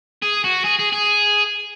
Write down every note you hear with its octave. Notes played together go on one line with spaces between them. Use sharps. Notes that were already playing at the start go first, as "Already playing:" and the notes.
G#4
F#4
G#4
G#4
G#4